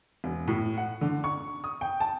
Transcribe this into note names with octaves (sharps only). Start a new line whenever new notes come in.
E1
A2
F#5
D3
C#6
D#6
G5
A5